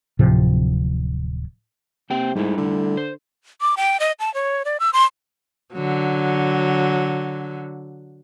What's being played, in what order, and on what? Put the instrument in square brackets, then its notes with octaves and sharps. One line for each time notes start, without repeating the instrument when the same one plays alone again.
[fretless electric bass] D1 A2 C3 F3
[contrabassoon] C3 [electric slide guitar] A#3 C4 G5
[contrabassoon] G#2 [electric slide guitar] G3 A3 E4
[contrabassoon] D3
[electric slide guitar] C5
[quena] D6
G5
D#5
A5
C#5
D5
E6
C6
[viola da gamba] D3 F#3